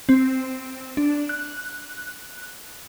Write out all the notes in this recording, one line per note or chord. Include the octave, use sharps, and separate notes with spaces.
C4
D4
F#6